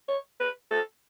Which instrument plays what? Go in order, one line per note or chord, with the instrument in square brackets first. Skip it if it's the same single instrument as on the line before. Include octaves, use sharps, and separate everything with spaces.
[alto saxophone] C#5
B4
A4